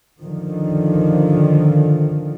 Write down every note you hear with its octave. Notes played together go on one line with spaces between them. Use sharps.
D3 D#3 F3